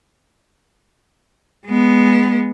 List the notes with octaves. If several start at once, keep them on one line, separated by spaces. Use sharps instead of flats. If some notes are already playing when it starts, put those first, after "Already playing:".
G#3 B3